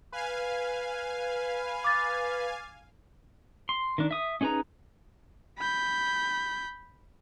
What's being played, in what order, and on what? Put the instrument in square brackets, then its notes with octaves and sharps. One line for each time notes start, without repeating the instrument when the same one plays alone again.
[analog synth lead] B4 [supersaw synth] F5 G#5
[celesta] D6 A6
[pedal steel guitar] C6
D#3 D4
E5 D#6
C#4 D#4 G#4 B4 A#5
[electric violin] B5 G6